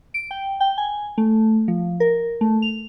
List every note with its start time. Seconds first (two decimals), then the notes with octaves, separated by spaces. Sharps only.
0.14 D7
0.31 G5
0.60 G5
0.78 G#5
1.18 A3
1.68 F3
2.00 A#4
2.41 A3
2.62 F7